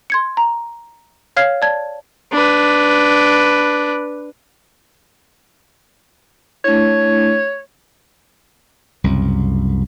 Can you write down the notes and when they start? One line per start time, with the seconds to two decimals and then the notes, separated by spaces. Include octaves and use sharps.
0.10 C6 G#6 C#7
0.37 A#5
1.37 C#5 F5 F6 G#6 C7
1.62 D5 A5 G#6
2.32 D4 B4
6.64 A3 D4 E4 C#5
9.04 C2 F#2 C#3